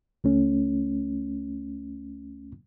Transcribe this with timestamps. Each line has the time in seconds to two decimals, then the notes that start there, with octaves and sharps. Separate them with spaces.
0.24 C#2 A3 C#4